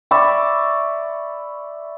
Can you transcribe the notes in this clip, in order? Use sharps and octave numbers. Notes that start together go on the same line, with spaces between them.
D5 E5 B5 C#6